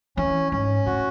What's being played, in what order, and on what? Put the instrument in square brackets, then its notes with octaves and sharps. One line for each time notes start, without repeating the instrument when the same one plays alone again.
[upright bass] E3 [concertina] C#4
[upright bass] G#2 [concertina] C#4
[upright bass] A2 [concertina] F#4